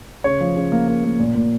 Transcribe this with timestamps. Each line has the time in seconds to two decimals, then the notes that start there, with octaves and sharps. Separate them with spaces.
0.24 C#3 C#5
0.41 F3
0.56 C#3
0.72 A#3
0.88 A#3
1.04 A#3
1.19 A#2
1.35 A#2